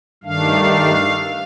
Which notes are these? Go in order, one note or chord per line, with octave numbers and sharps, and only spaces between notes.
G2 D#3 A3 D4 F5